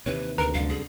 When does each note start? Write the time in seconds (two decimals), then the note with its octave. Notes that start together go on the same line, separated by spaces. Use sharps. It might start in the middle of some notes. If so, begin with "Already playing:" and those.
0.06 D#2 C3 E3 B4 C#5
0.38 D2 A#4 B4 A#5
0.54 C2 F#2 D3 F5
0.69 G#4